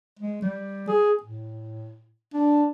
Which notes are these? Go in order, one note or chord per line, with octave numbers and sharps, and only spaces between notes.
G#3
G3
G#4
A2
D4